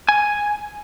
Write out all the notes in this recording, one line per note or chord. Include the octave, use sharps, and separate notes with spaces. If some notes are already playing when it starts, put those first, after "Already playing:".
G#5